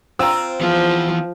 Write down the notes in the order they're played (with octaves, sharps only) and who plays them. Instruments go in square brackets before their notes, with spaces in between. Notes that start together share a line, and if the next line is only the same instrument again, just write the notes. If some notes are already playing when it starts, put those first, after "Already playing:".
[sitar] C4 F4 [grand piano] A#5 E6
[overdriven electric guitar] E3 B3 [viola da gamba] F3